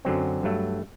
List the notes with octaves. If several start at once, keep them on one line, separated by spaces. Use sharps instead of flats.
F#2 D3 F#3 C4
G2 F#3 A3